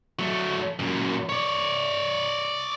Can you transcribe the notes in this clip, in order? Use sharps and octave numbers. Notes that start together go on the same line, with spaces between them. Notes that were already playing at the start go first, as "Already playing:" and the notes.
F#3 A3
F#2 A#2
C#5 D5